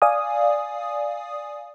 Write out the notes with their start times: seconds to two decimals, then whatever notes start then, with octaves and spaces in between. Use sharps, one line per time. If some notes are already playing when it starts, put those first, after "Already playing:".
0.02 D5 F5 G#5 D#6